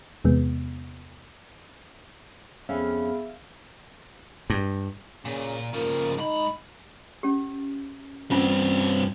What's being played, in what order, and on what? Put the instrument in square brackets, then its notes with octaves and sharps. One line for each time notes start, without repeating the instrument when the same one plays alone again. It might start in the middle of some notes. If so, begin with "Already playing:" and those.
[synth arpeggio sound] E2 C3 G#3 B3
[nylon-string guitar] F2 C#4 [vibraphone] B3 G#4 B5 [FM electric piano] E5 F5
[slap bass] G2
[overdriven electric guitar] A#2 [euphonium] C#3
[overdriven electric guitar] C#3 F3 [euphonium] A#3
[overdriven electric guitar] G#2 B5 [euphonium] D#4
[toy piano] C#4 G4
[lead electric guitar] G2 C4 [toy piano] C#4 F4 G#5